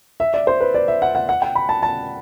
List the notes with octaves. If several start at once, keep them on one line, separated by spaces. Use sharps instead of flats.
E5
D5
C5
B4
D5
E5
F#5
F#5
F#5
G5
B5
A5
A5